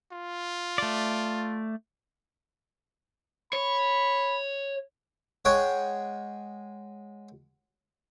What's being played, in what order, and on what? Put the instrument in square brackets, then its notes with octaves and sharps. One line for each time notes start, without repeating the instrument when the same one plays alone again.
[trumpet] F4
[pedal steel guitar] A3 D5
[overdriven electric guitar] C#5 [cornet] B5
[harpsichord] G#3 C#5 F#5 G5